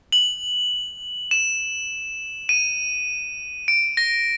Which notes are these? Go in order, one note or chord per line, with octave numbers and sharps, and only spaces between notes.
F#7
E7
D#7
D7
A#6